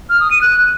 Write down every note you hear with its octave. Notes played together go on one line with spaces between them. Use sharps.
F6
D#6
D#7
F#6